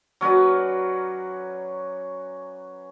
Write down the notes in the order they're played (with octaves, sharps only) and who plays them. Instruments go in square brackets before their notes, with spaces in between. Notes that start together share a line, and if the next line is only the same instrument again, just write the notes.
[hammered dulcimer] F#3 C#4 B4 D5